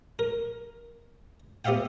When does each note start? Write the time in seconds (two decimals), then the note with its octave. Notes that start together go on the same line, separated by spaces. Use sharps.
0.19 A#4
1.65 B3 G4 C5 E5 F5 G5